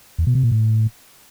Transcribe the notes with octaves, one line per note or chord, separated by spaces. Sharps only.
E2
B2
C3
A#2
A2